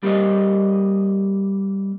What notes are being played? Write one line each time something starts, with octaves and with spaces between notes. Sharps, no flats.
G3 A#3 G4 C5 D#5